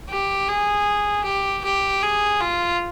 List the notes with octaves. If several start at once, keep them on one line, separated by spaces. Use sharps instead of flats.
G4
G#4
G4
G4
G#4
F4